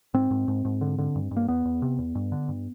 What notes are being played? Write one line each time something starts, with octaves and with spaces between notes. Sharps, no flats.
G#2 C4
G#2
G#2
G#2
D3
D3
G2
G2
A#3
E2 B3
E2
C3
E2
G2
D3
G2